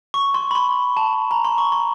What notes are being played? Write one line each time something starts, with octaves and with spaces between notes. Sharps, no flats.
C#6
C6
B5
C6
A5
A#5
C6
C#6
C6